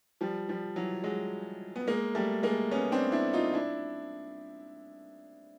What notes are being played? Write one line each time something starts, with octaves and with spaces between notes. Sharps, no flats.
F3 G3
F3 G3
E3 F#3
F#3 G#3
B3
G#3 A#3
G3 A3
G#3 A#3
B3 C#4
C4 D4
D4 E4
D#4 F4
D4 E4